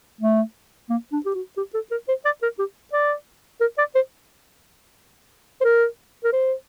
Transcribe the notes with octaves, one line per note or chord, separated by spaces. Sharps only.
A3
A#3
D4
G4
F#4
G4
A4
A#4
C5
D5
A#4
G4
D5
A#4
D5
C5
C5
A#4
A#4
C5